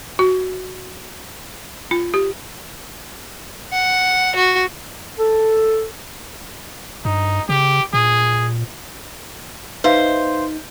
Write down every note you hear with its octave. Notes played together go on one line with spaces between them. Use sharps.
F#4
F4
G4
F#5
F#4
A4
G2 D#4
C#3 G4
A#2 G#4
D#4 B4 C5 E5 F5